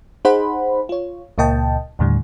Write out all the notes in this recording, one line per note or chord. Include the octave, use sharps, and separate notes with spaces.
D#4 G#4 C5 F#5 B5
F4 C#5
C#2 A#2 A#3 D#5 G5 A5
D#2 A2 D3 G3